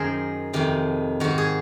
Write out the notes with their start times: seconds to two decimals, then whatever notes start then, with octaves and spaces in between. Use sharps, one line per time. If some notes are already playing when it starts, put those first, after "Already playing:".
Already playing: F#2 D#3 G#4 A#4 C5
0.53 F2 C3 D#3
1.20 G#2 D#3 F#4
1.38 G#4